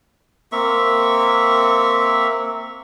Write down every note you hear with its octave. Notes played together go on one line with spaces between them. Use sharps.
A#3 C4 E5 C#6